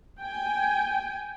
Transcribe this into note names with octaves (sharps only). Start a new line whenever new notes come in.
G5 G#5